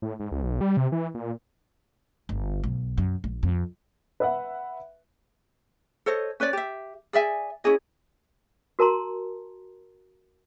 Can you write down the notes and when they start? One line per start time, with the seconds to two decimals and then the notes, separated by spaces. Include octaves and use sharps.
0.02 A2
0.20 G#2
0.31 C#2
0.43 B1
0.61 G3
0.77 C3
0.92 E3
1.15 A#2
2.29 G1
2.64 B1
2.98 F#2
3.24 A#1
3.43 F2
4.20 B4 E5 F#5
6.06 A4 C5 C#5 D#5
6.40 C#4 B4 C#5 D5
6.53 G4 E5
7.13 G#4 D5 E5 G#5
7.64 C#4 E4 G#4 D#5
8.79 F#4 A#4 A5 A#5 C6